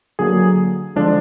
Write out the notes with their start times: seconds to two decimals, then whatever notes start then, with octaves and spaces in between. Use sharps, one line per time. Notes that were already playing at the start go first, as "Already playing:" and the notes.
0.19 D3 F#3 A#3 G#4
0.96 D3 F3 G#3 D4